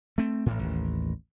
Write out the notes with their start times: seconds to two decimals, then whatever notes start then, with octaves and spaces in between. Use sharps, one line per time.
0.18 A3 C4
0.46 A1 A2
0.59 A1 D#2